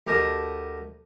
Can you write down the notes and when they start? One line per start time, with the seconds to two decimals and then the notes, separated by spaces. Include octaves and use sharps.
0.07 D2 G4 A#4 D#5 A5 D#6